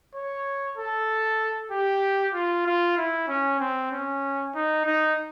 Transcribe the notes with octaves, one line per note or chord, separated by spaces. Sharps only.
C#5
A4
G4
F4
F4
E4
C#4
C4
C#4
D#4
D#4